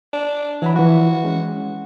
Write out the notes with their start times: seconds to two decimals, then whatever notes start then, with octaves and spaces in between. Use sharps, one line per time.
0.13 D4
0.62 E3 F#3 B5
0.76 E3 F3 F#4
1.24 G#3 C#4